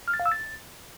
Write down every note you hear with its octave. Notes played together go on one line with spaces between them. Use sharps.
F6
A6
F5
E6
A6